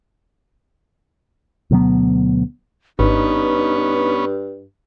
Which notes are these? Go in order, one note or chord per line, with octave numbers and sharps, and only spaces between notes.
D2 B2 F#3 B3
G#1 G2 B3 C#4 D#4